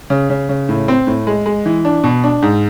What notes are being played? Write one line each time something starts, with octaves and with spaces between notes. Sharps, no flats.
C#3
C#3
C#3
A2
C4
A2
G#3
G#3
E3
D4
B2
D4
G#2